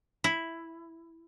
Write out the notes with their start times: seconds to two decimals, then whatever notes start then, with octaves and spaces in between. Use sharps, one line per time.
0.24 E4